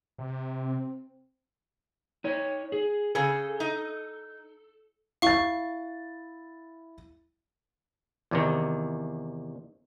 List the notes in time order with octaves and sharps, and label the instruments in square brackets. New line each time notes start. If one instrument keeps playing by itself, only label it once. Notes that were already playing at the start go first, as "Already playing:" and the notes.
[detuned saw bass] C3
[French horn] C4
[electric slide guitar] D#4 C#5
G#4
[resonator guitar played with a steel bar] C#3 G#4 [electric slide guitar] A4
[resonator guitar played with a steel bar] D#4
[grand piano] E4 A6 [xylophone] F5 C#6
[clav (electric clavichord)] E2 C3 D#3